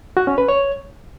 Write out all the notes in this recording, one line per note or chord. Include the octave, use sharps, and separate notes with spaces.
F#4
C#4
B4
C#5